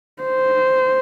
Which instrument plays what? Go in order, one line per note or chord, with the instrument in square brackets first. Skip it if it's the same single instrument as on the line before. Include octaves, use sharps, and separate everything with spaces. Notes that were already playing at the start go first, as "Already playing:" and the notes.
[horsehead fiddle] C5